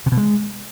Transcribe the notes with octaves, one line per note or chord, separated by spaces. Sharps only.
C3
B2
G#3